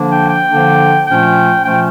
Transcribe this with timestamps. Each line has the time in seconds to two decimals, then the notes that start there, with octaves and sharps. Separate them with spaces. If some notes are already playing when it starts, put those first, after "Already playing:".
Already playing: D3 F3 A#3 D4
0.10 G5
0.29 G5
0.49 D3 F3 A#3 D4
1.06 A#2 F3 A3 C#4 G5
1.64 A#2 F3 A3 C#4 G5